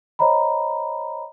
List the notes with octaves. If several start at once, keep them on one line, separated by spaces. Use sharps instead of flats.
C5 C#5 D#5 A#5 B5